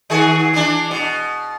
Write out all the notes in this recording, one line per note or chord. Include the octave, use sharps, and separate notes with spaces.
D#3 F#4 G#4
E3 D4
B2